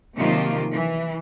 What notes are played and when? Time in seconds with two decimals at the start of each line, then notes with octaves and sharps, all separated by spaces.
0.17 C3 D#3 F3 F#3 A#3 F4
0.72 E3